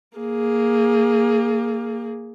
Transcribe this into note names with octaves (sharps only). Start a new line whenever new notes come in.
A#3 G#4